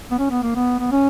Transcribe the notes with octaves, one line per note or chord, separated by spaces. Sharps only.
B3
C#4
B3
A#3
B3
B3
C#4